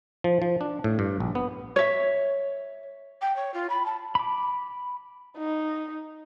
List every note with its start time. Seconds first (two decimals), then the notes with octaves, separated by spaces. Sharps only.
0.24 F3
0.42 F3
0.61 D4
0.84 A2
0.99 G2
1.20 A#1
1.35 B3
1.76 C#5 E5
3.22 G5
3.36 C#5
3.54 F4
3.70 B5
3.86 A5
4.15 B5 D6
5.37 D#4